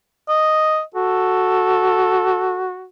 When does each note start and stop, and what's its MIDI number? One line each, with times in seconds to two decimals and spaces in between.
0.29 0.82 75
0.95 2.87 66
0.95 2.69 69